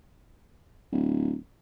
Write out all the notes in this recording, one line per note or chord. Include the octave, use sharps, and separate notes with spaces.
D1